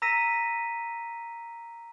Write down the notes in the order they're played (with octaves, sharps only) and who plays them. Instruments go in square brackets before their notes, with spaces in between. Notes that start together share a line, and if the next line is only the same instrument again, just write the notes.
[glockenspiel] A#5 E6 A#6 B6 D#7